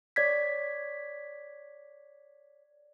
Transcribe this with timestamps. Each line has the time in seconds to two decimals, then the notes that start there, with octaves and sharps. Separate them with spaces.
0.16 C#5 D5 G#6 B6